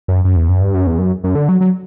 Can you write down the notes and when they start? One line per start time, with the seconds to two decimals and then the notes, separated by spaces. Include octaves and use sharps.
0.08 F#2
0.25 F#2
0.36 E2
0.49 F#2
0.61 G2
0.74 F#2
0.87 E2
0.99 F#2
1.24 F#2
1.35 D3
1.49 F#3
1.61 F#3